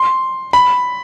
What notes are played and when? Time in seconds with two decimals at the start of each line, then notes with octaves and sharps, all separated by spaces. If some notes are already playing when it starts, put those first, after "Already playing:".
Already playing: C6
0.53 B5